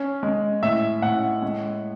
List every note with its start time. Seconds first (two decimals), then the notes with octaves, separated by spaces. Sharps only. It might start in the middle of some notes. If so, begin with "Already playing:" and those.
Already playing: C#4
0.23 G#3
0.63 A2 E5
1.02 A2 F#5
1.42 G#3